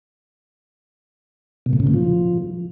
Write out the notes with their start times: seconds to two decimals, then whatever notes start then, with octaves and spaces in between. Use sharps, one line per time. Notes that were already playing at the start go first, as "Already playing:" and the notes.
1.66 B2
1.73 A2
1.80 C#3
1.87 A#2
1.94 F3